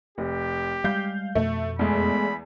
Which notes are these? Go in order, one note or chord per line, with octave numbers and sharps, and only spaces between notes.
F1 G4
G3 G#3 F5 G6
F2 B2 A3
E2 G#3 A3 B5